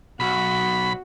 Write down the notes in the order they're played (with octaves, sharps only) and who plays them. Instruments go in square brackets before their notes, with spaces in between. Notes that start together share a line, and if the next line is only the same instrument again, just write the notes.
[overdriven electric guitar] B1 [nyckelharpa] F#4 [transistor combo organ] B5